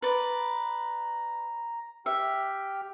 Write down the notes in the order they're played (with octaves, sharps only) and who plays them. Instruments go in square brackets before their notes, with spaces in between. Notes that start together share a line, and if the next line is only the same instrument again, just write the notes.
[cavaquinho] B4 D5 [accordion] A#5
[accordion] G4 G5 F6 [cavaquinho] E5